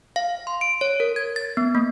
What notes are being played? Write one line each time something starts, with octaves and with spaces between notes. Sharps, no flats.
F5
C6
D7
C#5
A#4
G#6
A6
B3
A#3